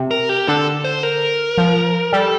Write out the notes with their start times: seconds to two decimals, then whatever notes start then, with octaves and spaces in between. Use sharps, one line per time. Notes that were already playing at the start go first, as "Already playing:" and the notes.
Already playing: C3
0.11 A#4
0.29 G4
0.48 D3 A4
0.85 C5
1.03 A#4
1.58 F3
2.13 G3 A4